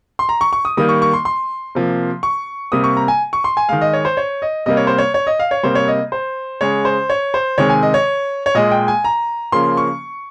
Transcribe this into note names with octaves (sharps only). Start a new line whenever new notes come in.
C6
A#5
C#6
C#6
D#6
D#3 G3 A#3 D#6
C#6
C#6
C6
C6
C3 F3 A#3
C#6
C3 G3 A#3 D#6
C#6
A#5
G#5
C#6
C6
G#5
D#3 G#3 F5
D#5
C#5
C5
C#5
D#5
C3 G3 A#3 D#5
C#5
C5
C#5
C#5
D#5
F5
C#5
C3 G3 A#3 C5
C#5
D#5
C5
C#3 G#3 C#5
C5
C#5
C5
C3 D#3 G#3 C#5
G#5
D#5
C#5
C#5
A#2 G#3 D#5
G5
G#5
A#5
C#3 F3 A#3 C6
C#6